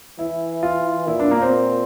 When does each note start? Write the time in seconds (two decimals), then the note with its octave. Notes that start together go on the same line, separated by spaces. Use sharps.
0.19 E3 E4
0.63 F4
1.08 A#2 E4
1.20 D4
1.31 A#3
1.42 C4